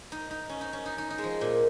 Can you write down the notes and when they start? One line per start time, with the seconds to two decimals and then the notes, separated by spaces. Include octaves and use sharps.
0.12 D#4
0.31 D#4
0.49 C#4
0.61 D#4
0.73 C#4
0.86 D#4
0.98 D#4
1.10 D#4
1.18 G#3
1.24 F3
1.41 A#2